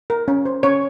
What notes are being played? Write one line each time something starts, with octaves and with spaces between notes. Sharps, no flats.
A#4
C#4
C5
C#4 C#5